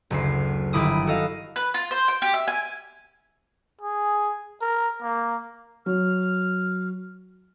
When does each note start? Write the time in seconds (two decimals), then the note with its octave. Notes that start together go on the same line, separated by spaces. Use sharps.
0.10 F#1 D2 C7
0.73 G1 D#3 E4 B5 D6 D#6
1.07 F#4 A4 D#5 F5
1.56 B4
1.74 F4
1.91 C5
2.08 G5
2.22 G4
2.34 E5
2.48 G#5
3.82 G#4
4.61 A#4
5.02 A#3
5.86 F#3 F6